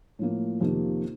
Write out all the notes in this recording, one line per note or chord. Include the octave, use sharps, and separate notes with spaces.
A2 F3 A#3
F2 C3 D#3 A#3 F4